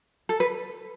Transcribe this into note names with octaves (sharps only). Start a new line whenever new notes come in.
A4
B4